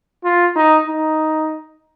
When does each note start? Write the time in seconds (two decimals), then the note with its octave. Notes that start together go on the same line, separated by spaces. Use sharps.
0.24 F4
0.56 D#4
0.88 D#4